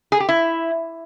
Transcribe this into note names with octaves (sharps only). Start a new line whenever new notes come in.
G#4
G4
E4